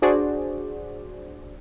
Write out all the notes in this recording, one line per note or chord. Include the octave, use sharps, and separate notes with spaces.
D4 F#4 G#4 C5 D5